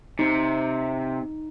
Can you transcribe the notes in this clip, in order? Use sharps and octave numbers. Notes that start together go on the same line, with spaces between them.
C3 D#4